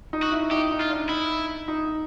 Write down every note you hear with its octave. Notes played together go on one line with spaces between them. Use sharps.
D#4
F#4
E4
D#4 G4
D#4
F4
D4
D#4 E4
D#4